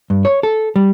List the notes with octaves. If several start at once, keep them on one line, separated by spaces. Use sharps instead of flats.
G2
C#5
A4
G3